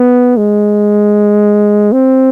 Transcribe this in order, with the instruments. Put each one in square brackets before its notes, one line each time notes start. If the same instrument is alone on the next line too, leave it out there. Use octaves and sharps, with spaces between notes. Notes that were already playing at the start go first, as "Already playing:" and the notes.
Already playing: [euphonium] B3
G#3
C4